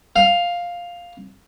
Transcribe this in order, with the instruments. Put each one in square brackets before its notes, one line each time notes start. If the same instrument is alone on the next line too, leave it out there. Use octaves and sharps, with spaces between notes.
[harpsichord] F5